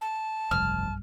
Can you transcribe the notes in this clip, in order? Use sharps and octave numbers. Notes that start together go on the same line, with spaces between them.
A5
F1 B1 G2 F6